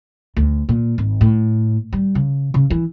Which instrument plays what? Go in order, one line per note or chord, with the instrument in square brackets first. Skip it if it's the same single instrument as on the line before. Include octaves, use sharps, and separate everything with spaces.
[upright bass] D2
A#2
G#1
A2
G3
C#3
C#3
E3